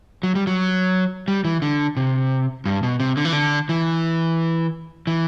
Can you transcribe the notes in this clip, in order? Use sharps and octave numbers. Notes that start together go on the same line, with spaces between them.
F#3
G3
F#3
G3
E3
D3
C3
G2
B2
C3
D3
E3
D3
E3
E3